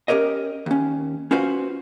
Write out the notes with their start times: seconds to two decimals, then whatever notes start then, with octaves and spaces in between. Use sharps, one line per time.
0.08 C#4 G4 A#4 C#5 D#5
0.66 D#2 C#4
1.31 C#4 F4 F#4 B4 C5